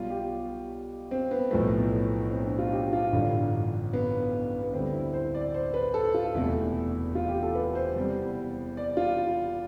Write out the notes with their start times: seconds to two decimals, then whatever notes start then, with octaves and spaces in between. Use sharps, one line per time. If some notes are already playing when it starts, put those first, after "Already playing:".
Already playing: B1 B2 G3 F4
0.10 G4
1.11 C4
1.31 B3
1.51 B1 A2 F3 A3
2.31 C4
2.45 D4
2.59 F4
2.73 G4
2.93 F4
3.13 A1 G2 D3
3.93 B3
4.62 B3
4.73 D2 D3 G3 C4
4.94 E4
5.13 C5
5.35 D5
5.54 C5
5.74 B4
5.94 A4
6.14 F4
6.35 E1 E2 C3 E3 A3 E4
7.15 F4
7.29 G4
7.43 A4
7.55 B4
7.75 C5
7.96 E2 C3 G3
8.77 D5
8.97 F4